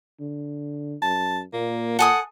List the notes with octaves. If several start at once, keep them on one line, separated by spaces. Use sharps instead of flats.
D3
F#2 A5
A#2 A#3
A4 F#5 G#5 D#6